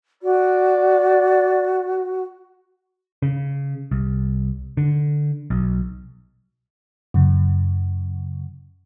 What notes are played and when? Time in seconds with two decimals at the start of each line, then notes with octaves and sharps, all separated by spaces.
0.23 F#4 D5
3.22 C#3
3.91 C2
4.77 D3
5.50 B1
7.14 F#2 C#3